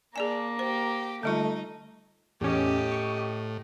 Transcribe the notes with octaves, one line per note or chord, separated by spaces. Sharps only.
A#3 D4 G#4 D5 G#5
G4 C5
D3 G3 A3 D#4 F4
E2 A2 C#4 G4 D#5
C#6